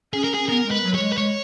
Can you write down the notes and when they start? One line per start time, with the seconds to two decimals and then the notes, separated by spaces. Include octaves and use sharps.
0.13 C#4 G#4
0.24 A#4
0.34 G#4
0.49 B3 A#4
0.66 G#3
0.71 B4
0.83 F#3
0.95 C#5
1.00 G#3
1.12 B4
1.17 G#3 C#5